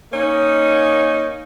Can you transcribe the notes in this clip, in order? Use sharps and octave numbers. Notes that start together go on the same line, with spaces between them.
A#3 C#4 D#4